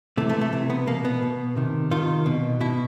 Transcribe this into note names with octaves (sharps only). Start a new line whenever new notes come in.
C3 E3 A3
A3
A3
C3 E3
B3
B2 A#3
B3
B2
C3 D#3
C3 D#3 F4
B2
B2 E4